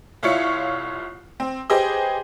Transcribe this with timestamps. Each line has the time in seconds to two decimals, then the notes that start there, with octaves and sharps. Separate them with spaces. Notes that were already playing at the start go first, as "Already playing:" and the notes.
0.23 C2 E4 F4 C#5 F5 C#7
1.40 C4
1.70 G4 G#4 B4 C5 D#5